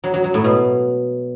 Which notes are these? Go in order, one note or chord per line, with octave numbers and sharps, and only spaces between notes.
F#3
F#3
F#3
A2
B2